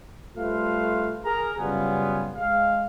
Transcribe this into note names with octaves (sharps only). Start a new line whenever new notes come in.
G3 A3 F4 B4 C5 F5
G#4 A#4 A#5
F#2 C#3 G3 B3 F4 G#5
G#3 F5